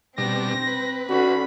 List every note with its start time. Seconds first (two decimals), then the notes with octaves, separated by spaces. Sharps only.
0.18 B2 G3 C4 D4 A#6
0.67 B4
1.09 D3 C#4 F#4 B5